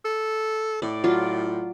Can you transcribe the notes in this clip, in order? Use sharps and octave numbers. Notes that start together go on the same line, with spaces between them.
A4
A2 D5
F#3 F4 D5